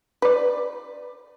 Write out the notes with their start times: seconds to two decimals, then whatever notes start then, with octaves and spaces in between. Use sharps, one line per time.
0.22 B4 D5